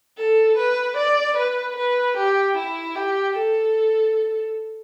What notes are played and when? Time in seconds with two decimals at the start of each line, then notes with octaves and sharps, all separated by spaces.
0.17 A4
0.57 B4
0.97 D5
1.36 B4
1.76 B4
2.17 G4
2.57 E4
2.95 G4
3.36 A4